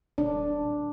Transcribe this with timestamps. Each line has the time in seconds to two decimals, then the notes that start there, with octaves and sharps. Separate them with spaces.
0.18 D#1 D4